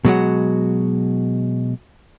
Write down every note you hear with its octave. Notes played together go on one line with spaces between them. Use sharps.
B2 F#3 G#3 F#4